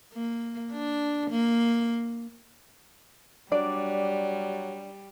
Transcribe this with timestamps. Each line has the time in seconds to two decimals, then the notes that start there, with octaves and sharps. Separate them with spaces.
0.13 A#3
0.72 D4
1.30 A#3
3.52 F#3 G3 D4 D5